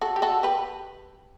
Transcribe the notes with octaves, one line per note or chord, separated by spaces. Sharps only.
F#4 A4
G4
F#4 A4
G4 B4